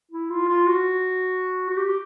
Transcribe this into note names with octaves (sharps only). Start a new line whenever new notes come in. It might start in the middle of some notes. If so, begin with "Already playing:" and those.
E4
F4
F4
F#4
F#4
G4